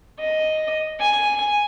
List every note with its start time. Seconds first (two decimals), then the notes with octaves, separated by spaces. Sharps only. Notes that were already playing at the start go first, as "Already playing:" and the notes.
0.20 D#5
1.00 G#5